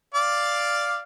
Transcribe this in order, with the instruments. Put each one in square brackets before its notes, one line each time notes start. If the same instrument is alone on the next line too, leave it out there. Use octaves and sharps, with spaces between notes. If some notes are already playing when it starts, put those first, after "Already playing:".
[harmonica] D5 F5 D6